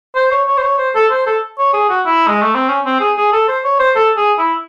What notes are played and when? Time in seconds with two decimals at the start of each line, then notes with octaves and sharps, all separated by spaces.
0.16 C5
0.31 C#5
0.48 C#5
0.57 C5
0.63 C#5
0.78 C5
0.95 A4
1.11 C5
1.27 A4
1.59 C#5
1.74 G#4
1.90 F#4
2.06 E4
2.27 G#3
2.42 A3
2.55 C4
2.69 C#4
2.86 C4
3.00 G#4
3.17 G#4
3.33 A4
3.48 C5
3.64 C#5
3.79 C5
3.96 A4
4.17 G#4
4.38 E4